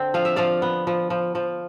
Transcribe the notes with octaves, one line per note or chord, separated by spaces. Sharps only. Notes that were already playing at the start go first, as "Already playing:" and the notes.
Already playing: D3 C4
F3 F5
E5
F3 D5 F5
B3
F3
F3
F3